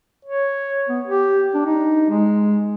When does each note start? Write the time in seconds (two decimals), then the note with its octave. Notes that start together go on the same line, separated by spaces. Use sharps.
0.25 C#5
0.89 B3
1.07 G4
1.54 D4
1.66 D#4
2.09 G#3